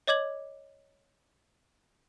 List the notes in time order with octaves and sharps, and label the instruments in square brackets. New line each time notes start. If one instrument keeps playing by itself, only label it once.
[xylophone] C#5 D#5 D6 G#6 F#7